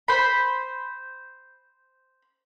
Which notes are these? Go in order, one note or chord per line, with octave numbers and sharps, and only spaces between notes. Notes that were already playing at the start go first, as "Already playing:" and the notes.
C5 B5